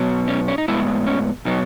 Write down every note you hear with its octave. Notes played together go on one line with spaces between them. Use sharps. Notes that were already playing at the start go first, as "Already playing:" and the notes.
Already playing: B2 F#3 B3
C#4
C#4
D#4
A2 G#3 B3 E4
C#4
B2 F#3 B3 D#4